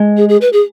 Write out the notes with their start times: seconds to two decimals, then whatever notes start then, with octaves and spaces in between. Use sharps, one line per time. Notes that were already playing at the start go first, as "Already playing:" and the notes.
Already playing: G#3
0.17 G#4
0.29 G#4
0.41 B4
0.53 G#4